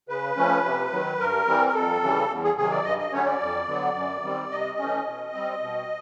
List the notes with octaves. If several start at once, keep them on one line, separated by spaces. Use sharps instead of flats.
C#3 B4
F3 A3 C#4
C3
D#3 F#3
G2 A#4
E3 G3 C4
A#4
F2 A4
C#3 E3 G3
E2
G#4
C3 D#3 F#3 G#4
D5
G2 D#5
D#5
D3 F#3 A3 C#4 C#5
D5
F2
D3 F#3 B3
F#2
D#3 G3 C4
C3 D#5
E3 A3 C#4
B2
G3 C4
B2